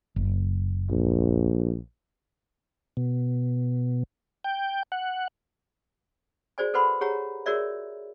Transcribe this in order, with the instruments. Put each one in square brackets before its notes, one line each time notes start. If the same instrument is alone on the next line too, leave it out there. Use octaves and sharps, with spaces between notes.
[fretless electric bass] F#1
[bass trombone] A#1
[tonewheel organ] B2
G5
F#5
[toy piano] F#4 G#4 C5 D5 G#5
A4 B4 C5 F#5 B5 C6
G4 G#4 C#5 F#5 A#5
F#4 G#4 A#4 C#5 D5 E5